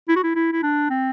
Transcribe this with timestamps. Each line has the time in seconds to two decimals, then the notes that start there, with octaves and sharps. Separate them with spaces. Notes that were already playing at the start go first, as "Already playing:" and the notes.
0.08 E4
0.16 F#4
0.23 E4
0.35 E4
0.52 E4
0.63 D4
0.90 C4